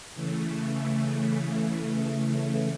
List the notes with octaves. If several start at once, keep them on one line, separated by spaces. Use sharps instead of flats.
C#3 E3 A3